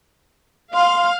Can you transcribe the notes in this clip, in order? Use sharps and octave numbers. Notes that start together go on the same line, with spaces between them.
F5 C6